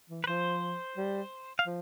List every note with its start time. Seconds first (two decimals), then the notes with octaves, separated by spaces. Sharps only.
0.10 E3
0.24 B4
0.27 F3 C5
0.97 G3
1.59 F5
1.66 F3